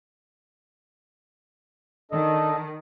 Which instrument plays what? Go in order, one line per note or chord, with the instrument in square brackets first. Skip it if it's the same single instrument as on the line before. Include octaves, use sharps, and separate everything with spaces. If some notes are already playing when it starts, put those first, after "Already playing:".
[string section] D#3 [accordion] D4 A4 D#5